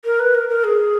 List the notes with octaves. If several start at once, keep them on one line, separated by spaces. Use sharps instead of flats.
A#4
B4
A#4
A#4
G#4